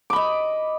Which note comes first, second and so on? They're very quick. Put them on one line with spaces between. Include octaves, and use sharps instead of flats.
D6 B5 D#5